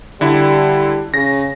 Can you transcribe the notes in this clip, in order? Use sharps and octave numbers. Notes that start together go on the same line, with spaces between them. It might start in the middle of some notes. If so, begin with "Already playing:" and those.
D3 G3 E4
C#3 A#6